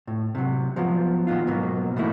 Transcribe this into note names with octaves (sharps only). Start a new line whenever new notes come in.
A2
C3 F#3
F3 F#3 B3
A#2 D#3 B3 F4
G#2 B2 F#3 A#3
B2 E3 A3 A#3 D#4 E4